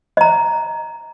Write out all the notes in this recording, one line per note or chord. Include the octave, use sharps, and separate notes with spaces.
D#5 A#5